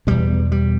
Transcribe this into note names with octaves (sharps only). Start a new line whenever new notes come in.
E2 B2 G3
G3